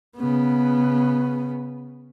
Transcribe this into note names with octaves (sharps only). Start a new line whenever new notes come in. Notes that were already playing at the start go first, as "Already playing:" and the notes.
C#3 B3